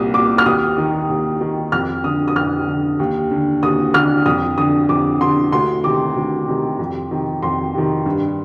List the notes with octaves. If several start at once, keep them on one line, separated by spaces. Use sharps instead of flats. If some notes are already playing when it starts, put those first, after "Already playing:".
Already playing: C2 A#2 D#6
A#2 D6
F6
D#2 D#6
D#3
D#2
D#3
F2 F6
D3 D#6
D#6
F2 F6
D3
D#2
D3
D#2 D#6
D3 F6
F2 D#6
D3 D#6
F2 D6
D3 C6
D2 C6
C3 D#3 D6
D2
C3 D#3
F2
C3 D#3
F2 C6
C3 D#3
G2